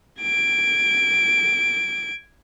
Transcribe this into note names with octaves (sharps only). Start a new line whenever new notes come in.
G#6 D7